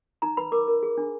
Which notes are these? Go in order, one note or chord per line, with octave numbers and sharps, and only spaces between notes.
D#4 A#5
B4 B5
A#4 D6
A#4
G#4
D4